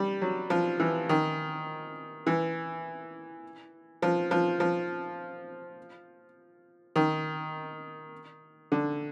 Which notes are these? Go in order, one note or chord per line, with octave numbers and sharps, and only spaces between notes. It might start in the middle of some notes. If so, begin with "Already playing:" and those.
Already playing: G3
F#3
F3
E3
D#3
E3
F3
F3
F3
D#3
D3